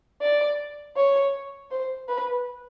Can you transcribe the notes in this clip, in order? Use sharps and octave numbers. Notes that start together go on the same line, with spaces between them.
D5
C#5
C5
B4